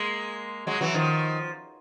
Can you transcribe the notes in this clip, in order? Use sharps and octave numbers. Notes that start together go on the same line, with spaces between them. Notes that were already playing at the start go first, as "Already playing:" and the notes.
Already playing: G#3 A#3
F#3 G#3
E3 F#3
D#3 F3